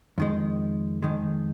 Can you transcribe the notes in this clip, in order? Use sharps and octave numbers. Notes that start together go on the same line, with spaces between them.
F2 D#3 G#3
F2 D#3 G#3